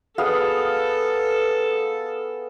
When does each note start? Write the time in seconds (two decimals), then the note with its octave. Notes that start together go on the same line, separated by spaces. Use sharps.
0.18 B3 G#4 A4 F5